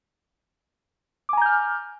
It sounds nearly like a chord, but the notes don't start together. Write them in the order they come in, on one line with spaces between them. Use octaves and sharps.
D6 G#5 A#5 G6 F6